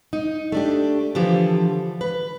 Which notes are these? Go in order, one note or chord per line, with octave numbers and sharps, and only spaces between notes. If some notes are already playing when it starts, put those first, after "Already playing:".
D#4
A3 D4 G4
D3 E3 F3 G4
B4